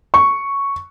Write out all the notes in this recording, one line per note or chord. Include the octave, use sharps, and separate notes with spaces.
C#6